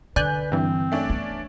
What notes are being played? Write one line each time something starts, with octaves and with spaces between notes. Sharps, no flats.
D3 B4 D5 G#5 F#6 G6
G2 E3 C4
A3 C#4 D4
B3